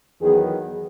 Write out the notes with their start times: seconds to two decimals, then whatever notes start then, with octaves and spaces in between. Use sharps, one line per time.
0.20 E2 D#3 F#3 B3 G#4